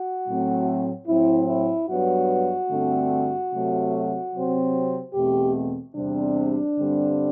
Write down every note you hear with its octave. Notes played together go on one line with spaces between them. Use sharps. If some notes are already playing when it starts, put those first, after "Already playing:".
Already playing: F#4
A2 F#3 A3 C4
A2 F#3 C4 E4
E4
G2 F#3 B3 F#4
G2 D3 A3 C4
C3 F#3 A3
C3 F#3 C4
E2 B2 A3 C4 G4
E2 C3 G3 C4 D4
G2 D3 G3 C4